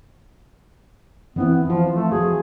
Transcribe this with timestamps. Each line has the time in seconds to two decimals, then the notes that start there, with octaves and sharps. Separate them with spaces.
1.36 E3 B3 C4 E4
1.65 E3 F3 F4
1.96 A3
2.12 F3 F#4 G#4